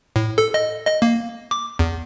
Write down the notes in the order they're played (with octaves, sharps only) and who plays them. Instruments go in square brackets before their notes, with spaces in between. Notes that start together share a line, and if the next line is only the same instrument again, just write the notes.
[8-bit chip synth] A2
A4
D#5
D#5
A#3
D6
E2